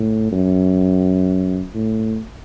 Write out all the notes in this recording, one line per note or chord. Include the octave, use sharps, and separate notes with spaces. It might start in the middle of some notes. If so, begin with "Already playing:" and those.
Already playing: A2
F#2
A2